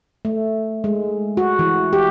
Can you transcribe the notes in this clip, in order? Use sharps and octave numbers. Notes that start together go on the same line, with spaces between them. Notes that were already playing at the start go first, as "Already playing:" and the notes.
A3
G#3
F#4
E3
G4